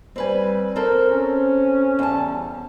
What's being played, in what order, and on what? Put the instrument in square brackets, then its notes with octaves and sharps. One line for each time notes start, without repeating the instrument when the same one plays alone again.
[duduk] G3 [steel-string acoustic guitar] C4 B4 G#5
[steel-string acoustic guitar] C4 A4 C5 [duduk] A#4
[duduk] C#4
[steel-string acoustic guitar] E2 G3 A5